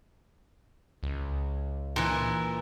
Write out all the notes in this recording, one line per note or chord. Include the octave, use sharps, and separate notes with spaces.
C#2
A#2 E3